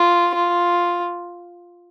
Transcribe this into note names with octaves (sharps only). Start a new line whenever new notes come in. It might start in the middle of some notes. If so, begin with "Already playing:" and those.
Already playing: F4
F4